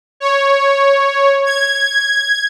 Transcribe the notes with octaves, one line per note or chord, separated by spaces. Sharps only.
C#5
G#6